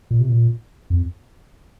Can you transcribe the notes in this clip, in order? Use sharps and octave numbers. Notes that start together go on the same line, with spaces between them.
A#2
C3
A#2
F2